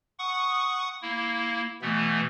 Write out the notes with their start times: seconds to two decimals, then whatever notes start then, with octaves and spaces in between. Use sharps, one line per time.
0.19 F#5 C#6 D#6
1.02 A#3 E4
1.82 B2 E3 A3 B3